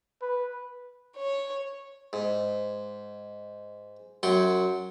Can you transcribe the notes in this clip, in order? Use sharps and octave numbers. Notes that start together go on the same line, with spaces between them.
B4
C#5
G#2
F#2 F#3 G5 C6 C#6